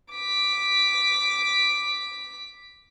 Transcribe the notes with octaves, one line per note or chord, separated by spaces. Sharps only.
D6 B6